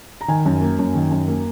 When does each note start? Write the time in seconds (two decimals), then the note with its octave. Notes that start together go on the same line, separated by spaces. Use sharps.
0.21 A#5
0.28 D#3 G#5
0.46 F#2
0.61 A#3
0.79 F#2
0.95 D#3
1.11 F#2
1.28 A#3